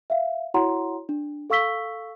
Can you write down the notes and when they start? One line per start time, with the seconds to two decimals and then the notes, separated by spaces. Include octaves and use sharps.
0.10 E5 F5
0.54 E4 F#4 C#5 F#5 A#5 C6
1.09 D4
1.50 A4 F5 C#6 E6 B6 G7